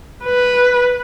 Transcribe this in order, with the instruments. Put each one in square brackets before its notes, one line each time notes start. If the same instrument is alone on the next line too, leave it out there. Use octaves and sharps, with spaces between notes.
[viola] B4